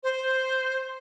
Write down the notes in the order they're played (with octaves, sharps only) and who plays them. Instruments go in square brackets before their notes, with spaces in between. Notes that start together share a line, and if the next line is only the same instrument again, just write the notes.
[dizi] C5